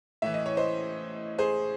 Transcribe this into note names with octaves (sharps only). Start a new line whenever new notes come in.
A2 E3 E5
D#5
C#5
C5 D#5
G#4 C5